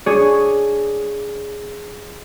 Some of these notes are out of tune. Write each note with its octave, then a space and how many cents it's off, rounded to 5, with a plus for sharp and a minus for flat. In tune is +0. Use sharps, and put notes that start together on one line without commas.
D4 +0 G#4 +0 C#5 +0